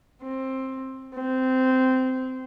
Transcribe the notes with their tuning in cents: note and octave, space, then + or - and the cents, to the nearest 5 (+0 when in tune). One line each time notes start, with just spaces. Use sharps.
C4 +15
C4 -15